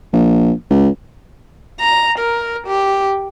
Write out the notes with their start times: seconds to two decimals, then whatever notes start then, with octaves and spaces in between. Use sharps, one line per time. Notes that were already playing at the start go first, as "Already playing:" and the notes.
0.13 A#1
0.70 C#2
1.80 A#5
2.19 A#4
2.67 G4